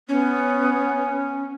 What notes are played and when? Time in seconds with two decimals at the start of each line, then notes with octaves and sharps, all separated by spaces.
0.09 B3 C#4